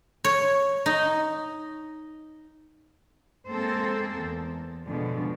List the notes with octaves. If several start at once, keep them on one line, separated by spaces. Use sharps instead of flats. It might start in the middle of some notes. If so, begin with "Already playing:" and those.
C#5
D#4
G#3 A#3 C4 A4 C5
E2
B2 D3 F3 G#3